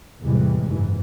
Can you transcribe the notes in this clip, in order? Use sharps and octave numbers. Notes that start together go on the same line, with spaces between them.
E2 A2 C3 E3 G3 G#3
F#1 G#2 E3